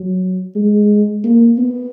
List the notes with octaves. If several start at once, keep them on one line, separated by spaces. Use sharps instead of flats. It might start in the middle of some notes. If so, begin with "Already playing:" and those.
Already playing: F#3
G#3
A#3
B3